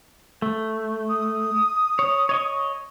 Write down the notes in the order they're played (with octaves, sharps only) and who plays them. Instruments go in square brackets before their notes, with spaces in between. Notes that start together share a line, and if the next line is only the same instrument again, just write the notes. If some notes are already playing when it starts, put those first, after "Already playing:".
[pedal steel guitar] A3
[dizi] D#6
[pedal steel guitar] C#5
C#5 D#5 C#6